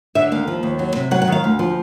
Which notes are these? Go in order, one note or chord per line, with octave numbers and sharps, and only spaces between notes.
D3 E5
D#2 F5
F3
D#2
F#3
C3
F#3 F#5
F#5
D#3 F5
D2
F3